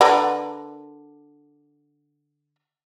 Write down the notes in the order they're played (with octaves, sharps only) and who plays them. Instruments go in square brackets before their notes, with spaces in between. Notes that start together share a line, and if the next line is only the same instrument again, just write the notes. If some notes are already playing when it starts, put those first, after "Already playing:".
[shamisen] D3 A#4 B4